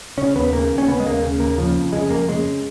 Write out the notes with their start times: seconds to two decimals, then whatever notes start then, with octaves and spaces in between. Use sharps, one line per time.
0.18 C#3 C#4
0.35 D#2 B3
0.52 C#3 A#3
0.70 D#2
0.78 C#4
0.88 C#3 B3
1.00 G#3
1.06 D#2 A#3
1.22 C#3
1.40 D#2 A#3
1.58 C#3 F3
1.75 F2
1.93 C#3 G#3
2.10 F2 A#3
2.28 C#3 G#3